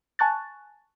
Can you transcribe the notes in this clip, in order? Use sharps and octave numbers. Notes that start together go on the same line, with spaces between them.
G#5 A5 C#6 F#6 A6